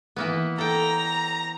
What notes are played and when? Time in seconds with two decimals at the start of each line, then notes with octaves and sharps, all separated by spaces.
0.16 E3 A#3 B3
0.58 A4 G5 A#5